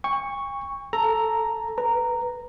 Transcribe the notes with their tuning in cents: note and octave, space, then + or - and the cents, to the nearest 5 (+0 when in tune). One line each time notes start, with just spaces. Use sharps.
G5 +45 C#6 +0
A4 +0 A#5 +0
B4 +0 A#5 -10